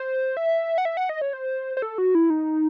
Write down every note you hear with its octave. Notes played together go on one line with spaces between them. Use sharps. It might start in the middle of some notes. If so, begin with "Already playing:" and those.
Already playing: C5
E5
F#5
E5
F#5
D#5
C#5
C5
C5
A4
F#4
E4
D#4